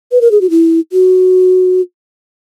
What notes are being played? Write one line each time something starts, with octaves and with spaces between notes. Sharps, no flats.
B4
A#4
G#4
F#4
E4
F#4